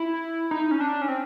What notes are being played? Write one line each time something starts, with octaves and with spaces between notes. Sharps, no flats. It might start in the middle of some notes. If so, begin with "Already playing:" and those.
Already playing: E4
D#4
C#4
D4
C#4
C4